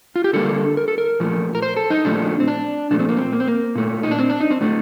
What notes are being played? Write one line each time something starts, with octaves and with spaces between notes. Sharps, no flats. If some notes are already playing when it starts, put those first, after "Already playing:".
F4
G4
D3 G3 A#3 A4
A#4
A4
A#4
A#2 F3 A3
A#4
C5
A4
D#4
A#2 F3 A3 D4
C4
D4
A#2 F3 A3 D4
C4
A#3
C4
A#3
C4
A#3
A#2 A3
D#4
D4
C4
D4
D#4
C4
A2 A3 D4